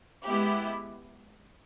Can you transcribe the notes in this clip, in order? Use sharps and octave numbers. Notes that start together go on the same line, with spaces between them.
G#3 B3 E4 G4